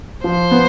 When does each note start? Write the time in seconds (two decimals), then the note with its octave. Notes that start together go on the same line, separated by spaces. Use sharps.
0.24 F3 C5
0.51 B3